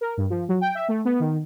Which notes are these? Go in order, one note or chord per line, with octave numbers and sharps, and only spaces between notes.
A#4
G2
F3
F#3
G5
E5
A3
B3
D#3